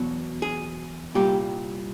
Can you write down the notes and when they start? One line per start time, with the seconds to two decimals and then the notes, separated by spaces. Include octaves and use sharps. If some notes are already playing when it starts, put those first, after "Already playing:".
Already playing: E2 B2 F#3
0.42 G#4
1.14 C2 A#2 G3 G4